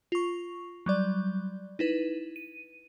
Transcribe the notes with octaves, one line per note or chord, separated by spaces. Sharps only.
F4 C#6
F#3 G3 D5
D#4 E4 B4
D#7